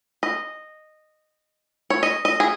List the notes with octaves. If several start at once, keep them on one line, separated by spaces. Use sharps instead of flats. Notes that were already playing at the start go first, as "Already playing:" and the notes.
D#5
C#5
D#5
D#5
G#4